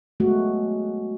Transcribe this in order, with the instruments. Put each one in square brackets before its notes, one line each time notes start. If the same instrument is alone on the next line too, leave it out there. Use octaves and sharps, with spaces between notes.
[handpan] F#3 G#3 A3 B3 F#4